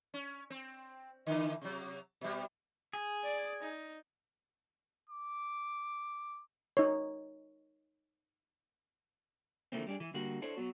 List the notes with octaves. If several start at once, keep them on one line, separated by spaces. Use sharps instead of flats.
C#4
C4
D3 E3
C3 F#3
B2 G3
G#4
D5
D#4
D6
D#4 C#5
D3 E3 F3 A3 A#3 C4
G3 D4 G#4
E3
D3 G3 A#3 F#4
D4 E4 A4 C5 C#5
F#3 B3 F#4